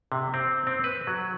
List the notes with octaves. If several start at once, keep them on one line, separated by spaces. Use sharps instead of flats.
C3
C4
C4
B4
F#3